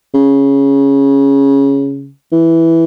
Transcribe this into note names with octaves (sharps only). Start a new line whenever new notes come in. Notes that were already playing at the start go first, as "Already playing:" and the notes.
C#3
E3